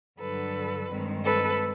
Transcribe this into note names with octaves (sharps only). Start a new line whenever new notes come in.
G2 D3 F#3 A4 B4
G2 D#3 G#3 C4
A4 B4